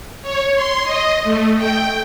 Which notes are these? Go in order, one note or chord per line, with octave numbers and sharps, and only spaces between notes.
C#5
C6
D#5
A3
G5